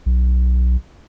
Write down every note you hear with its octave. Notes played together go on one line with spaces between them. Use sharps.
B1